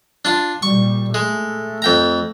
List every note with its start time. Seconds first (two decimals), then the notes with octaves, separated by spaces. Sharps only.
0.25 D4 F4
0.63 A#2 G3 C#6
1.14 G#3 A3
1.82 F2 G5 A#5